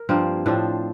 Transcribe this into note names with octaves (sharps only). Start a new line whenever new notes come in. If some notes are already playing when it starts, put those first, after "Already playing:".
Already playing: A#4
G2 F3 A#3 C4
A2 F3 C4 D4